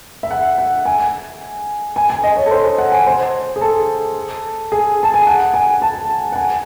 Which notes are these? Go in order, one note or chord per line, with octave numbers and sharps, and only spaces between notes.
E5
F#5
F#5
G#5
G#5
G#5
D#5
C#5
A4
C5
F#5
G#5
C5
G#4
A4
G#4
A5
G#5
F#5
G#5
A5
F#5
G#5